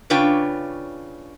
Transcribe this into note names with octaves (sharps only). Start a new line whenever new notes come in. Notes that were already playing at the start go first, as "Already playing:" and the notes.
C#3 D4 F4 B4 C#5 G5